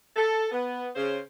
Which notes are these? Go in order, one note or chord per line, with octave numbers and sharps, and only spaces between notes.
A4
B3
C#3 C5